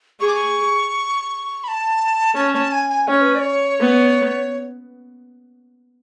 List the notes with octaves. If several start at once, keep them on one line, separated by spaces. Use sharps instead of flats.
G#4 C#6
D6
C#6
B5
A5
C#4 A5
A5
G#5
G#5
C#4 C#5
B4
D5
C#5
B3